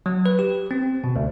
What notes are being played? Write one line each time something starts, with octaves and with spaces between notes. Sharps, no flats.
F#3
B4
G4
C4
B2
D2